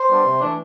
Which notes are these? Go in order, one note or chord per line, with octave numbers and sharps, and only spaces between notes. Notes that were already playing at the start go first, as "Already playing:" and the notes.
Already playing: C5
G3 B3 D4
C3
E3 A3 D4